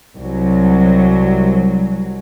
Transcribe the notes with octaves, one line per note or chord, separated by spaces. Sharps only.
C2 F#3